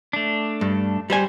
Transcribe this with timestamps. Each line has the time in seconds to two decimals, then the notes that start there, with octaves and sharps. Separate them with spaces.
0.13 A3 D4
0.61 G2
1.10 G3 C5 G#5